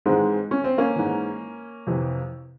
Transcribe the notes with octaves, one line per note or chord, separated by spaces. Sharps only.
G#2 E3 G#3 C4
C#4
C4
A#3 C#4
G#2 E3
F2 C3 E3